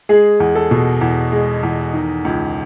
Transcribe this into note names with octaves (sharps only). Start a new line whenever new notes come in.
G#3 G#4
E2
A4
B2
E2
G#3
E2
D#3
C#2